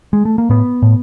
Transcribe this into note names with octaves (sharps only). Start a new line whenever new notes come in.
G#3
A3
A#3
A2 B3
A2